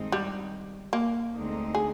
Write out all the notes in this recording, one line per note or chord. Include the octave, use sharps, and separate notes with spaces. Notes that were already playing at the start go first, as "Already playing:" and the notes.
Already playing: G2 D#3 G#3 C4 D#4
G3
A#3
D2 D3 G#3 C4 D#4
G#4